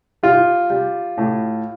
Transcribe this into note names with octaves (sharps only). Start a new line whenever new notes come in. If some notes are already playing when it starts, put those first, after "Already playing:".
G3 F4
G3
A2